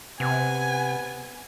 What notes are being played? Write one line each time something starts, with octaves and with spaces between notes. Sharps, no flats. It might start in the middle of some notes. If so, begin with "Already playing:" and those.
C3 B3 G#5